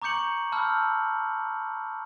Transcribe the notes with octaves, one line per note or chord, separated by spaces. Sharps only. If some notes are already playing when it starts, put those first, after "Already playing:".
A#5 C#6 D6 G6 C#7 F#7
A5 B5 E6 F6 G6